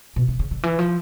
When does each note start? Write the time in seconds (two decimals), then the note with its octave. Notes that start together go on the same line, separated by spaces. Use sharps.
0.16 B2
0.28 C3
0.39 C#3
0.51 D3
0.63 E3
0.79 F3